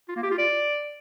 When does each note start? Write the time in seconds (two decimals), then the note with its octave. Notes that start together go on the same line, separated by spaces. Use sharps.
0.08 F4
0.16 A#3
0.23 G4
0.31 F4
0.38 D5